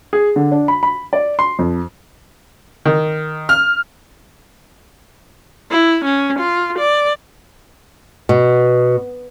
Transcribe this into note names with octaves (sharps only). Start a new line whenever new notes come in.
G#4
D3
D4
B5
B5
D5
C6
F2
D#3
F6
E4
C#4
F4
D5
B2